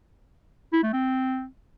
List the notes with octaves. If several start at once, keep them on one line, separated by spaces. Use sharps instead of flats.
E4
A3
C4